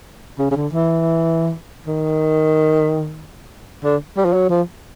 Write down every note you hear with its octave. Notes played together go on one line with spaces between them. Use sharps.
C#3
C#3
D3
E3
D#3
D3
G3
F3
F#3
F3